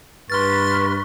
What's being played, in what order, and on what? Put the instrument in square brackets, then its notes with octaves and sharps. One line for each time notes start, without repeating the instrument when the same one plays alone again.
[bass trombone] G2 [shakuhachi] B4 [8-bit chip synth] C6 F6 A6 [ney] C#6